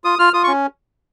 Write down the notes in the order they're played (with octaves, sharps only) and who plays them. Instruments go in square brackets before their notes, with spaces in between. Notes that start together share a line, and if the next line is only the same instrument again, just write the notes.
[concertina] F4 D#6
F4 F6
F4 D#6
C#6
C#4